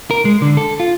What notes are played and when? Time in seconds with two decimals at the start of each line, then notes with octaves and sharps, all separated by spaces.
0.11 A#4
0.25 G#3
0.42 D3
0.57 A4
0.80 F4